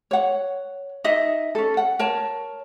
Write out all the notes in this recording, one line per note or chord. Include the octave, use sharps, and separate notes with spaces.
C#5 F#5
D#4 D#5 E5
C#4 A4
F#5
A#4 C#5 A5